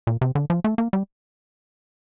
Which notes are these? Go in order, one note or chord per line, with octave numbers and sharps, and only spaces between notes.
A#2
C3
D3
F3
A3
A#3
G3